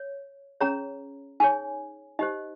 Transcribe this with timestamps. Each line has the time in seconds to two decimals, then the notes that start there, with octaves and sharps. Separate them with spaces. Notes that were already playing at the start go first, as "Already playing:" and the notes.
Already playing: C#5
0.61 C#4 G#4 C#5 A#5
1.40 D#4 G#4 C#5 G#5
2.19 D#4 G4 C5 D#5